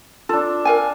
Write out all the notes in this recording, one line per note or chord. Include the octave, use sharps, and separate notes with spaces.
D4 F4 A4
A#4 F5 G#5